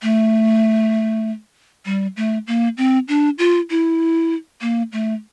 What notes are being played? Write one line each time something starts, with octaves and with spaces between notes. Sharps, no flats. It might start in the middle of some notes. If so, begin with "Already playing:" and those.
A3
G3
A3
A#3
C4
D4
F4
E4
A#3
A3